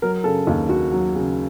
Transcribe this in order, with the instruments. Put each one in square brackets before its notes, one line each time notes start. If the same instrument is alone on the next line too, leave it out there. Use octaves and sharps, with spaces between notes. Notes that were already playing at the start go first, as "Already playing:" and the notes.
[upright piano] F#3 A#4
C#3 A4
D#2
D#2 F#4
F#3
C#3